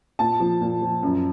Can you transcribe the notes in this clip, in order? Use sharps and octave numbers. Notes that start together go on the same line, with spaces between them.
A#2 A5
F3
A#2
F3
F#2